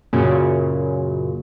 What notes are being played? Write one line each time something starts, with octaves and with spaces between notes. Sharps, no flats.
F#2 A#2 C#3